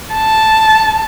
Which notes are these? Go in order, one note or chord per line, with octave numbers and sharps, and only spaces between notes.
A5